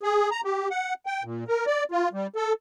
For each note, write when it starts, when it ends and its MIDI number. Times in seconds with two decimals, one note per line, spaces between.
0.03 0.30 68
0.31 0.41 82
0.44 0.68 67
0.70 0.94 78
1.06 1.23 79
1.24 1.44 46
1.48 1.65 70
1.66 1.84 74
1.92 2.09 65
2.13 2.27 55
2.36 2.53 69